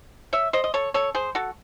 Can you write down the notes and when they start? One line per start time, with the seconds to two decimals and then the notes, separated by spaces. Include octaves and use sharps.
0.33 C#5 E5
0.53 C5 D#5
0.64 D#5
0.74 A4 C#5
0.94 A4 C#5
1.15 G#4 C5
1.35 F#4 A4